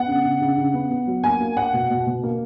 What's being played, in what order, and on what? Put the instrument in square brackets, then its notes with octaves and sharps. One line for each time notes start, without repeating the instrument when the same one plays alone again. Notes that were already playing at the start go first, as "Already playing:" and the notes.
Already playing: [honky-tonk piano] B3 F#5
C#3
C#3
C#3
C#3
B3
B3
F#3
A#3 G#5
A#3
A#3 F#5
B2
B2
B2
A#3